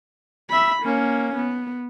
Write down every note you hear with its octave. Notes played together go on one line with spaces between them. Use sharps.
E5 B5
A#3 C#4
B3